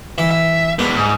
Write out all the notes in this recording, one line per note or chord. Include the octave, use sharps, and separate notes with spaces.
E3 E5
E5
G#3 B3 D4
G#2